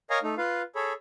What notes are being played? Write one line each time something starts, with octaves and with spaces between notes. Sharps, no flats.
A#4 C#5 D#5 F5 G#5 A#5
A3 D#4
F4 B4 F5
G#4 A4 C#5 B5